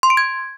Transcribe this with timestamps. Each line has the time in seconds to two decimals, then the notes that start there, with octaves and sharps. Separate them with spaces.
0.03 C6
0.10 D7
0.17 G#6